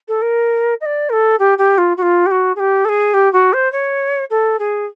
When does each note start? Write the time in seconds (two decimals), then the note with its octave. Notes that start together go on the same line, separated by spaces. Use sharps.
0.08 A4
0.22 A#4
0.81 D#5
0.86 D5
1.10 A#4
1.13 A4
1.39 G4
1.58 G4
1.78 F4
1.97 F#4
2.02 F4
2.26 G4
2.31 F#4
2.56 G#4
2.60 G4
2.85 A4
2.89 G#4
3.14 G4
3.33 F#4
3.53 C5
3.72 C#5
4.30 A4
4.59 G#4